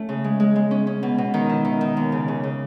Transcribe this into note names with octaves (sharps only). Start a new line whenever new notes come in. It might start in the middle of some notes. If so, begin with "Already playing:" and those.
Already playing: A3 C#4
C#3
G#3
G#3
G#3
C#4
C#4
B2
B2
D#3
E4
D#3
D#3
D#2
C#3
C#3
C#3